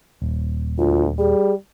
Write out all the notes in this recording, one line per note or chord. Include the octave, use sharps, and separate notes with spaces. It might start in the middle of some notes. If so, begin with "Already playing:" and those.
D#1
D2 F4
G3 G#4